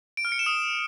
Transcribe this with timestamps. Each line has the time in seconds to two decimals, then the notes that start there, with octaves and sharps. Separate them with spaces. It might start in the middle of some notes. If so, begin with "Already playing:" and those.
0.17 D7
0.25 F6
0.32 C#7
0.39 E7
0.46 D#6